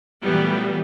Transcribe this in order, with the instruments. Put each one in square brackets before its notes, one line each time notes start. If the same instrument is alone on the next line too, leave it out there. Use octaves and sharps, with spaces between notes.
[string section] A#2 E3 F#3 G3 A3 B3